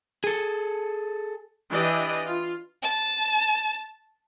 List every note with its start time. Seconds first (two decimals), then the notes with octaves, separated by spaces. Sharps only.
0.24 G#4 A4
1.71 E3 D4 G4 D5 D#5
2.26 F4
2.83 A5